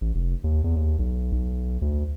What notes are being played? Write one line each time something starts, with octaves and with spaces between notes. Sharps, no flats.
A1
F1
D#2
E2
D#2
B1
B1
D2